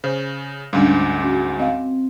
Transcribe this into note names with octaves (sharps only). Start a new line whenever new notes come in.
C#3 C5
D2 G#2 G3 C#4 D4
C#4 F#4
C4 D#5 F5